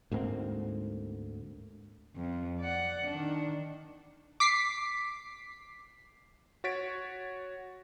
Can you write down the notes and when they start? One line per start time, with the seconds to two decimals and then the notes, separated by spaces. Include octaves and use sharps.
0.12 D2 G#2 A#3 C4
2.16 F2
2.60 D5 F#5
3.08 D#3 D4
4.40 D6 B6 C7
6.64 F#4 C#5 A6 B6 D7